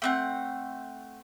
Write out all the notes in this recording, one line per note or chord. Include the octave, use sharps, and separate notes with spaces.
A3 C4 F#5